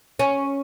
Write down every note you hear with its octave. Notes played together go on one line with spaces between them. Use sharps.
C#4